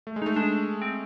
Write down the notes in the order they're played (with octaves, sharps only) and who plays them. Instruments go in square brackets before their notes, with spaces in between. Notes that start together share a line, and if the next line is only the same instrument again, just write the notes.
[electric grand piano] A3
G#3
[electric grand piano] A3 [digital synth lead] D#4
[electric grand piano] G#3 [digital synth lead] D4
[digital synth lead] C4